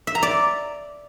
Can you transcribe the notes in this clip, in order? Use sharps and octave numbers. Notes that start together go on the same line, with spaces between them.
E5
A#5
D5